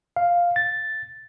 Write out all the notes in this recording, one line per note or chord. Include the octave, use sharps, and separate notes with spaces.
F5
A6